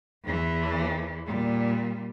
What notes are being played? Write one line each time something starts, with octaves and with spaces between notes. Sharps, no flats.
E2 E3
A#2 G3